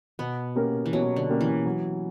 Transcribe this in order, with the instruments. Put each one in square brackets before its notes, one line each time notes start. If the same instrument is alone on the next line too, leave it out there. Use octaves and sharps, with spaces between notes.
[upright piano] B2 [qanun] B3
[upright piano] A#3 C#4 G4 A#4
[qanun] E3
[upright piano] B2 [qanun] F#3
[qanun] D3
[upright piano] A#3 C#4 G4 A#4
[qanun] E3
[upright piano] F#3